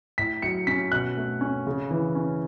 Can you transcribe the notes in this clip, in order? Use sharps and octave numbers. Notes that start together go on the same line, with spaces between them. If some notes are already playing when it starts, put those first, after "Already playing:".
A2 B6
F#3 C#7
C#4 B6
B2 F#6
A3
C#4
C#3
E3
C#4